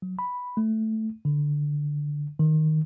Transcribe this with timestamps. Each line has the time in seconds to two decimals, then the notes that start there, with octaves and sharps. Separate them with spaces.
0.02 F#3
0.19 B5
0.57 A3
1.25 D3
2.39 D#3